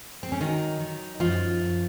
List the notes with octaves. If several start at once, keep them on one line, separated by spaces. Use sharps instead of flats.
C4
C#4
D#3 F#3 D#4
D#3
F#2 F3 F4
F#2